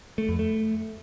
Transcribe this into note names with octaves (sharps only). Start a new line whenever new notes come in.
A3
F2
A3